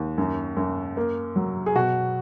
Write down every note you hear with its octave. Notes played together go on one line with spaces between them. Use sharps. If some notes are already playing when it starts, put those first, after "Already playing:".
Already playing: D#2
F#2
F#2
A#3
F#3
G#4
B2 F#4